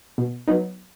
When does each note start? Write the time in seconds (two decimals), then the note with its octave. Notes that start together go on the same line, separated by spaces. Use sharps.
0.18 B2
0.47 F#3 B3 D#4